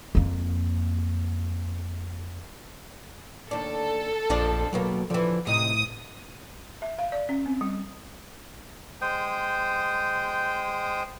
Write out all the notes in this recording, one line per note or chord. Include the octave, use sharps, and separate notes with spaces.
F2 A#3
D#2 D4 A4
A#1 F2 F3 D4
D#2 B2 F#3 A#3
D3 E3 F3
A2 C3 D#4 D#6
E5
F5
D5
C#4
C4
G3
G#3 C5 G5 D#6